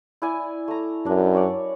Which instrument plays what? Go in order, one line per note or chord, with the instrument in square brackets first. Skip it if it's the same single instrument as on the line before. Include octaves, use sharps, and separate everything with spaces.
[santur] E4 D5 G#5
A3 A#5
[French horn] F#2 [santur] D4
[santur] C#5 D5